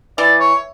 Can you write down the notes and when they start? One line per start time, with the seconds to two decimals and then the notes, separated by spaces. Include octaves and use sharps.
0.18 E3 D5
0.40 C#5